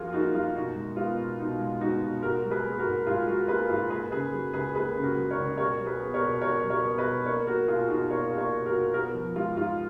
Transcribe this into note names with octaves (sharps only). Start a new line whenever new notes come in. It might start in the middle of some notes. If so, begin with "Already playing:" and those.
Already playing: F#2 F3 A#3 F4 F#4 G#4 A#4
A#3 D#4 F#4
F#2 F4
B2 D#4 F#4
G#3
B3 F4
B2
B2 D#4
G#3
B3 D#4 F#4
B2
G#2 F#4 A#4
F#3
G#4 B4
A#3
F#4 A#4
G#2
G#2 F4 G#4
F#3 F#4 A#4
A#3 G#4 B4
G#2 F4 G#4
A#3 G#4 B4
C#3 G#4 B4
F#3
C#2 G#4 B4
A#3 G#4 B4
C#3
F#4 A#4
F#3
A#4 C#5
C#2
B2 A#4 C#5
F#3
G#4 B4
B3
A#4 C#5
B2
B2 A#4 C#5
F#3
A#4 C#5
B3
B4 D#5
B2
A#3 A#4 C#5
A#3 F#4 A#4
B2 F4 G#4
B2 D#4 F#4
A#3 A#4 C#5
A#3
A#4 C#5
B2
F#4 A#4
B2
B3 F#4 A#4
F3
G#3 F4
G#2 F4